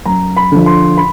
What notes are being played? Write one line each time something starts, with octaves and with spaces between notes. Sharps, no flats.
F#2 A#5
B5
D3 F3
C6
B5